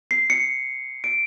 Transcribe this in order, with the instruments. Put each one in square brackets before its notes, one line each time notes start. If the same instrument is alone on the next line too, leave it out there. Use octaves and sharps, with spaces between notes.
[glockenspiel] C7
C#7
D7